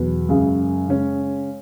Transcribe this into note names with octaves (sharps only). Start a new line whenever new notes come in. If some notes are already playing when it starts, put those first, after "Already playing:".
Already playing: E2 B2 F#3 B3
F#2 C#3 G#3
C#3 G#3 C#4